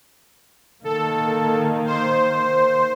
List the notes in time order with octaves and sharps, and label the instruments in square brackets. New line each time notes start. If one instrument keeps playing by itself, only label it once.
[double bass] D#3 A#3 [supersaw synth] A4
[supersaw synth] C5